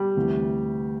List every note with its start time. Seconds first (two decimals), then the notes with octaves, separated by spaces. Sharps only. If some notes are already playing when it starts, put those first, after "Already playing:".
Already playing: G3
0.17 D2 C3 E3